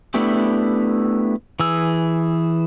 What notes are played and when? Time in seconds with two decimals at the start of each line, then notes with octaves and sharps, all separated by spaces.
0.14 A3 B3 D4 E4 G4
1.60 E3 G#4 E6